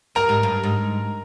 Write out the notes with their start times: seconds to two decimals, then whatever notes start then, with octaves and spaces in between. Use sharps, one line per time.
0.15 G2 A#4 A#5
0.29 G#2
0.43 G2
0.63 G#2